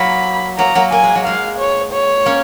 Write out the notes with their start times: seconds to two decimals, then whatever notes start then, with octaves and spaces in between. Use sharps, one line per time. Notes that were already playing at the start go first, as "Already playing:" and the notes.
Already playing: F#3 A#3 B5
0.58 F#3 A#3 A#5
0.75 F#3 A#3
0.91 A#3 G#5
1.04 G#3
1.15 F#3
1.25 G#3 F5
1.58 C#5
1.93 C#5
2.26 A#3 C#4